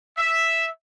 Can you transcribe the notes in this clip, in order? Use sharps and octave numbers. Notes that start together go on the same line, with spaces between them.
E5